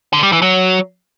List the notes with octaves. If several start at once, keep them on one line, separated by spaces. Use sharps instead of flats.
D3
G3
E3
F#3